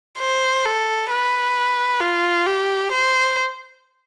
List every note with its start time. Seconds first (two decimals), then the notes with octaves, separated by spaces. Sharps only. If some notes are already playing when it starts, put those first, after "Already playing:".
0.19 C5
0.65 A4
1.11 B4
2.01 F4
2.46 G4
2.92 C5